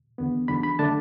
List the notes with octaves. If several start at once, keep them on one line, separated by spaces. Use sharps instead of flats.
E2 D3 B3
E2 D3 F#3 D4 B5
B5
D3 A3 D4 A5